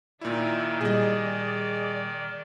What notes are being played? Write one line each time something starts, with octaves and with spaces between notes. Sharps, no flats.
A#2 D#3 D#4 E4 D5 E5
A#2 G3 G#4 D5 D#5